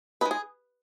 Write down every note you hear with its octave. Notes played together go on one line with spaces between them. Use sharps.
G#3 D#4 B4
G#4